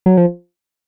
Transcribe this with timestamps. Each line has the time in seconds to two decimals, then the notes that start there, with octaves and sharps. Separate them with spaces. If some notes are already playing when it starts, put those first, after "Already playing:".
0.06 F#3
0.17 F3